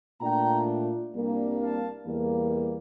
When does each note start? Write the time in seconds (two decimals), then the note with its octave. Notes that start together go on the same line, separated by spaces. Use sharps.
0.21 A#2 A3 D4 F4 G5 A#5
1.13 C2 C3 G3 A#3 D4
1.59 F5 A5
2.05 E2 E3 G3 A#3